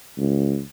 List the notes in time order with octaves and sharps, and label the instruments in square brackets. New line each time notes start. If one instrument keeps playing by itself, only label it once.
[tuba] C#2